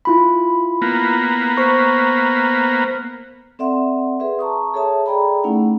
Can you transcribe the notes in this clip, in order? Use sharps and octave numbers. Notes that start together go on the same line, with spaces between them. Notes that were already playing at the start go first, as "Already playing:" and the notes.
E4 F4 B5
A#3 B3
C5 C#6
C4 A4 D5 E5 F#5 C6
G#4 B4 E5 C6
A5 A#5 C#6 D#6
G#4 A4 C#5 E5 A5 D#6
G#4 A4 D5 G5 A#5 B5
A3 C#4 D#4 E4 F#5